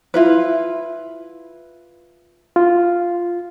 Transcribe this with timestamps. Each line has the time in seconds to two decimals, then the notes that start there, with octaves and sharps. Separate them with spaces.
0.14 E4 F4 B4
2.56 F4